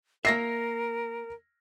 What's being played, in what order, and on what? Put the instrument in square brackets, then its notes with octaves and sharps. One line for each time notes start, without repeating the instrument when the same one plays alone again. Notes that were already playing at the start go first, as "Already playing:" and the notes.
[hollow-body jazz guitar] A#3 E5 [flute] A#4 [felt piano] A#6 C7